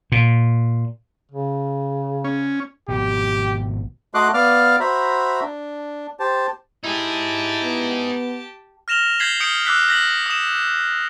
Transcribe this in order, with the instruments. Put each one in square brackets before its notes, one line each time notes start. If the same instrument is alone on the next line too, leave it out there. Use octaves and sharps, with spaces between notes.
[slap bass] A#2
[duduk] C#3
[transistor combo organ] C#4
[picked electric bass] G#1 B2 [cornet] G4
[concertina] A3 F#4 D#5 C6 D6 F#6
B3 D5 F5 D6 F6
F#4 C5 E5 A#5 B5
D4
G4 C5 A5
[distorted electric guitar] D#4 G#4 [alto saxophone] E4 [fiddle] G4 A5
[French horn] B3
[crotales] F6 A#6 E7 F7 G7
G6 G#6 B6 C7 F#7 G7
D#6 G6 C#7 D7 G7
D6 E6 F#6 B6
G6 A#6 B6 F#7
D#6 E7